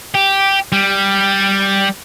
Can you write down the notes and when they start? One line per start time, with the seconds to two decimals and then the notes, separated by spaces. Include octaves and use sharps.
0.15 G4
0.72 G3